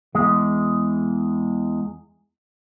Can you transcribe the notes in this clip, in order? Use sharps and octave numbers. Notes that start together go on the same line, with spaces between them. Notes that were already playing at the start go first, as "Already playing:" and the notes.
E2 G#3